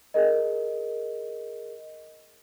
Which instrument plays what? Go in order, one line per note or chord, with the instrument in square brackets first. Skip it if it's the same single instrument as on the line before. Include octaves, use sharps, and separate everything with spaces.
[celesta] G#4 A#4 D#5